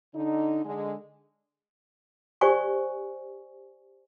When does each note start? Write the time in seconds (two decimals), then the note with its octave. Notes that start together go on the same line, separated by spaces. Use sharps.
0.15 D3 D#4
0.65 D3 G#3
2.41 G4 C5 D5 G#5 C#6